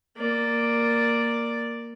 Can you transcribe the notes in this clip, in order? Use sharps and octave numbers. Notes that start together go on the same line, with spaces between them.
A#3 D5